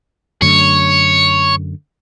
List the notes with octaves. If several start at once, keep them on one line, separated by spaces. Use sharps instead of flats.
F#2 D3 A3 C#5